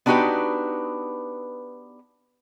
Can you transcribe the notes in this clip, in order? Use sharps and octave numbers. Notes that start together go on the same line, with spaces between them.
B3 D4 D#4 F#4 G4 B4